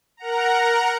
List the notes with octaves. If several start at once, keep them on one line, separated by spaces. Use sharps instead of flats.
A#4 F#5 A#5